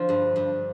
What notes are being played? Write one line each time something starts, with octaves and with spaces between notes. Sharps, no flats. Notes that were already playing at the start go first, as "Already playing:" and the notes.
Already playing: D3 F3 F4
G2
G2